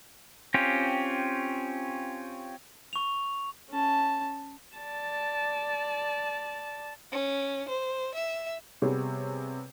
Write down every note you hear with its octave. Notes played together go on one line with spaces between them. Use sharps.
C4 C#4 F4 G4
C#6 F7
C#4 A5
D5 A5
C#4
C5
E5
C3 G3 B3 G#4 C#5